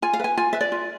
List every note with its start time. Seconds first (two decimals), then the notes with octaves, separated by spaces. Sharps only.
0.02 F4 G#5
0.13 F5
0.20 B4 G#5
0.37 F4 G#5
0.53 B4 E5
0.61 D5
0.72 F4